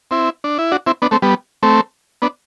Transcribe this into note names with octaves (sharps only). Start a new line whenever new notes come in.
C4 E4
D4
E4
D4 F#4
C4 E4
B3 D4
A3 C4
G3 B3
A3 C4
B3 D4